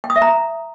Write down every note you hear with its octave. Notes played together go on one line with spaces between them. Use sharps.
G5
D#6
E5
A#5